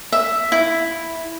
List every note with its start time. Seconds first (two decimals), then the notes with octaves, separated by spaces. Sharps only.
0.12 E5
0.52 E4